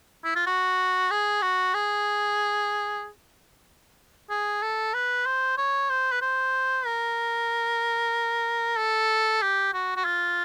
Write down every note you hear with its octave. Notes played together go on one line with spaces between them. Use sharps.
E4
F4
F#4
G#4
F#4
G#4
G#4
A4
B4
C5
C#5
C5
B4
C5
A#4
A4
G4
F#4
F#4
F4